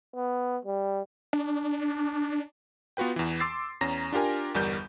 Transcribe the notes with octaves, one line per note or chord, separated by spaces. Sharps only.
B3
G3
D4
B3 F4 F#4 B4 G5
E2 E3
C6 D6 E6 A6 C7
E2 C#4 A#5 A#6
D4 F4 G4 A#4 G#5
G1 E2 G3 A#4 G6